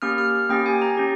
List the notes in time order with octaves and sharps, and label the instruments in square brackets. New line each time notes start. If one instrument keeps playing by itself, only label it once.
[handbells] A#3 C#4 G4 F6
F6
A#3 C#4 G4 G5
G#5
A#5
C#4 G4